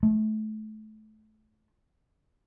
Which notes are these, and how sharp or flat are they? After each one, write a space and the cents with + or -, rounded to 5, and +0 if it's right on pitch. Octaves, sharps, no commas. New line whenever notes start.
A3 -25